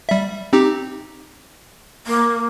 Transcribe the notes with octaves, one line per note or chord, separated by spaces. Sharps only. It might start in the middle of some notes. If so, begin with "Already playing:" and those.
G3 E5
C4 D#4 G4
A#3